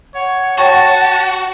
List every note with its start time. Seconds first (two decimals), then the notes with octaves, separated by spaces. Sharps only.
0.15 C#5 F#5
0.58 F#4 C#5 G5 A5 C#6